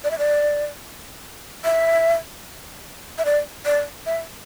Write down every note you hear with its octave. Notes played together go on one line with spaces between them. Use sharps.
D5
E5
D5
E5
E5
D5
D5
E5